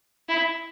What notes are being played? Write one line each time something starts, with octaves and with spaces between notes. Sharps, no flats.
E4